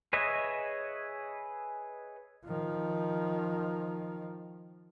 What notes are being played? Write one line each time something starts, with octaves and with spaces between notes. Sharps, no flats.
G#4 B4 C#5 D#5 E5
D#3 F3